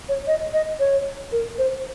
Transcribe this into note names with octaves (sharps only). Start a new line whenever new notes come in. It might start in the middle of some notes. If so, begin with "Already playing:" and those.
C#5
D#5
D#5
C#5
A#4
C5